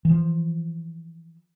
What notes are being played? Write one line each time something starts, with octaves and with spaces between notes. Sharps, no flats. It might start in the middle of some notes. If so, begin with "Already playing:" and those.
E3 F3